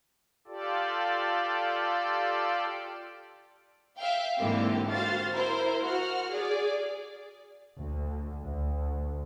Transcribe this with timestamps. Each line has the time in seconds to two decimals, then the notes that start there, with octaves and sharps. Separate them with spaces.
0.47 F4 G4 A4 D5
3.98 E5 F5 G5
4.39 G#2 D3 E3 A#3 C4 G4
4.92 F#4 C5 F5 A6
5.34 E4 A#4 C5
5.85 F#4 F#5 F6
6.32 G#4 D5
7.79 D2
8.43 D2